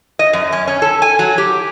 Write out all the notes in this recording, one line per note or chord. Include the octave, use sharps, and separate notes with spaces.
D#5
F#2
C#4
C#4
A4
G#5
F#3
G4